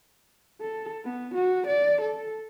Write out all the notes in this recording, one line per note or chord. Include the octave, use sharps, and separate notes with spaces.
A4
B3
F#4
D5
A4